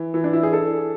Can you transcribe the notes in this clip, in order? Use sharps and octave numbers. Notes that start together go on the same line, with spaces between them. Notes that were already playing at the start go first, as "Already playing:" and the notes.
Already playing: E3
E3
D4
E4
G#4
A4